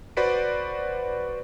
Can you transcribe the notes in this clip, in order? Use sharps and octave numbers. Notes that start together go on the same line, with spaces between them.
F#4 B4 C5 D5 B6 D7